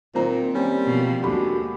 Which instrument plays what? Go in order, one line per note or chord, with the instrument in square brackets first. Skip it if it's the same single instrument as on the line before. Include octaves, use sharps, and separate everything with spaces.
[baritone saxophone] A#2 [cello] D#3 [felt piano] C4 C5 A#5
[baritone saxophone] G3 [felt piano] A#3 C4 C#4
[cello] B2 F3
[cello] D#2 G#3 [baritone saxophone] D3 [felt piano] F#4 G4 B5